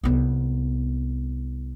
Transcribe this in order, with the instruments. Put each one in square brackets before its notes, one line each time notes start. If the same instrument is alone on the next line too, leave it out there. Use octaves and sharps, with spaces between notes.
[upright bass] C2 B3